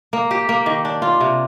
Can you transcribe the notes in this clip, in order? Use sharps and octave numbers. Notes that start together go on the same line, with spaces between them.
A#3
G4
A#3
D#3
D4
F4
C3